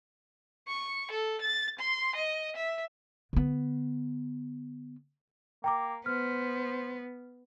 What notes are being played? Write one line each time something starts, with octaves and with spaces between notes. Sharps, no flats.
C#6
A4
A6
C6
D#5
E5
D3 B3
A#3 G5 A#5 D6
B3 C5 F6